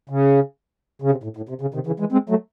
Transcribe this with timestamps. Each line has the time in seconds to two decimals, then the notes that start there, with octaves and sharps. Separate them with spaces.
0.09 C#3
1.02 C#3
1.11 C3
1.23 A2
1.37 A2
1.49 C3
1.61 C#3
1.74 C3 D#3
1.87 C#3 E3
2.00 E3 G#3
2.12 G#3 C4
2.29 F#3 A3